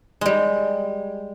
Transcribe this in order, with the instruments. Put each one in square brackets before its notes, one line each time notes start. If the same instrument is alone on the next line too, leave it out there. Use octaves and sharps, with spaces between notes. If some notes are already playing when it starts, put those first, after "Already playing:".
[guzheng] G3 G#3